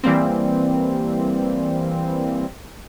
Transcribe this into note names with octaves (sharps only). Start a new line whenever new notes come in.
E3 G3 A#3 C4